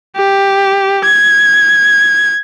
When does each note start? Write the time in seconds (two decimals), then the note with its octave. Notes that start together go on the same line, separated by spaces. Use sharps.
0.16 G4
1.05 G#6